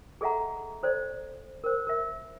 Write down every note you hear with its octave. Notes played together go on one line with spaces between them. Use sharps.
G#4 A4 D#5 E5 F#5 A#5
A4 C5 D5
A#4 C5
A#4 E5